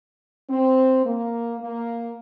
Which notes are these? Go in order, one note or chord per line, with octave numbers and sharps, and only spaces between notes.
C4
A#3
A#3